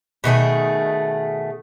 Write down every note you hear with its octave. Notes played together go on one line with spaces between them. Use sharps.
B2 D#3 A3 G#4